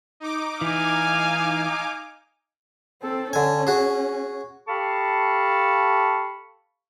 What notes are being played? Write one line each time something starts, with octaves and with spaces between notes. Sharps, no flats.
D#4 D6
E3 F5 G#5
C4 A4
D3 C#4 G#5
F#4 G#4
G4 A4 F5 A5 B5 C#6